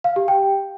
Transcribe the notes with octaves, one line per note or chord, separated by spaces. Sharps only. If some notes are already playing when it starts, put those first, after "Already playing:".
F5
G4
G5